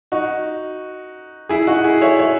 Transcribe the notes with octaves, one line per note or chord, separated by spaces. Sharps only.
D#4 F#4
E4 G#4
D#4 F#4
E4 G#4
C#5 E5
C#5 E5